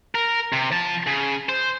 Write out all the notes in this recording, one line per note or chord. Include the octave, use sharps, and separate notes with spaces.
A#4
C3
F3 A5
C#3
C5